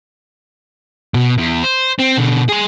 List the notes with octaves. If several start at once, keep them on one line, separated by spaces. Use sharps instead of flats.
B2
E2
C5
C4
B2 D3
G#4 C6